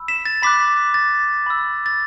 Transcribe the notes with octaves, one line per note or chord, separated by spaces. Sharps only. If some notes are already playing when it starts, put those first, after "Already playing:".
Already playing: B5 E6
B6 E7
A6
B5 D6 F#6 B6
A6
B5 E6
A6